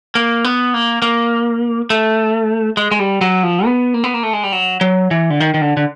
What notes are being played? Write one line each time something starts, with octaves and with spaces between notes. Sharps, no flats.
A#3
B3
A#3
A#3
A3
G#3
G#3
G3
F#3
F3
B3
A#3
B3
A#3
A3
G#3
G3
F#3
F#3
E3
D3
D#3
D#3
D3
D3